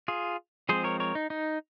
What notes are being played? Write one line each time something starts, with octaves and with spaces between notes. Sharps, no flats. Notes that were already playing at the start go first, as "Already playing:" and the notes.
F4 G#4
F3 G#3 C4 G#4 C5
A#4 C#5
A#4 C#5
D#4
D#4